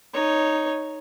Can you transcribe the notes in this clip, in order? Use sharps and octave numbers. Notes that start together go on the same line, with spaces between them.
D#4 C#5